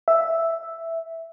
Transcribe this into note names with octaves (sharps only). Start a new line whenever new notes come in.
E5